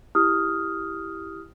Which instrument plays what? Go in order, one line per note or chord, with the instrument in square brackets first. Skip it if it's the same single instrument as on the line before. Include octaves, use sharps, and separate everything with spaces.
[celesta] E4 G4 D#6 F6